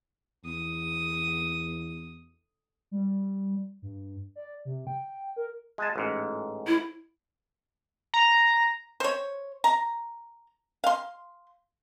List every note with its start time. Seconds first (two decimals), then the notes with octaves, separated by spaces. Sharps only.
0.45 E2 D#6
2.91 G3
3.82 G2
4.36 D5
4.65 C3
4.87 G5
5.36 A#4
5.78 G#3 G#5 A5
5.96 A1 G#2
6.67 E4
8.14 A#5
9.00 C5 C#5
9.64 A#5
10.84 F5 C6